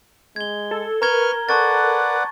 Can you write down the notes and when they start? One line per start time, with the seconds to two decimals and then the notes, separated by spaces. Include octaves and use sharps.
0.36 G#3 G#6 G7
0.71 A4
1.02 A#4 B4 A#5 C#6 F6 G#6 G7
1.49 A4 B4 D5 F#5 A5 C#6 A6